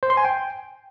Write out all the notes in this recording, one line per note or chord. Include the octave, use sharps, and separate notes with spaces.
C5
C6
G#5
G5